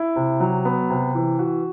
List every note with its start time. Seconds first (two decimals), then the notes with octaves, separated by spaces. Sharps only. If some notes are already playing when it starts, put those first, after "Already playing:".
Already playing: E4
0.16 C3
0.40 F#3
0.65 B3
0.90 C3
1.15 E3
1.39 F#4